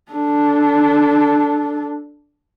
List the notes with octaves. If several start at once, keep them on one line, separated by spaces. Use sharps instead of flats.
D4 A4